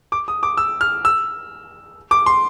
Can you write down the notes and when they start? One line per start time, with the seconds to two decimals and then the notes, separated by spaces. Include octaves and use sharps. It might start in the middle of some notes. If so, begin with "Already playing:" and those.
0.12 D6
0.28 D#6
0.43 D6
0.57 E6
0.81 F6
1.05 E6
2.11 D6
2.26 C6